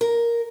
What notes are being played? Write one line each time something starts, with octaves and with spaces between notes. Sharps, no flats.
A#4